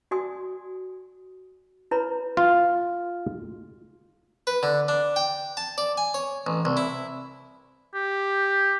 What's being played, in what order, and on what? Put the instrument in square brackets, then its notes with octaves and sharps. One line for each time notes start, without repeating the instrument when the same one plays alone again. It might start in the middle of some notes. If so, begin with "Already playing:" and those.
[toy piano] F#4 D5 G#5 C6 D#6
E4 B4 C#5 A#5 B5
[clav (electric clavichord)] F4
[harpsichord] B4
D3
D4
G5
A5
D5
G#5
C#5
A1
C2
E4
[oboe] G4